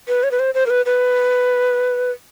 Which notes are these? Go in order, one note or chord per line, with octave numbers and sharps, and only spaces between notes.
B4
C#5
B4
C5
C5
A#4
B4
B4